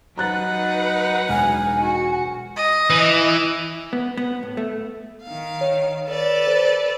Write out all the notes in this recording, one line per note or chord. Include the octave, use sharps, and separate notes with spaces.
F#3 D#4 B4 F#5 A#5 F#6 A6
E1 G#5 F6
F#4
D#5
E3
B3
B3
A2
A3
D#3 F5
C#5
A4 B4 D5
C5